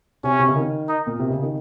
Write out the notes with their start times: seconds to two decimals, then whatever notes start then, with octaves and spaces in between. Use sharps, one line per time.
0.24 C3 C#4
0.39 C3
0.48 C#3
0.56 D#3
0.89 D#4
1.07 A#2
1.19 C3
1.30 C#3
1.42 D#3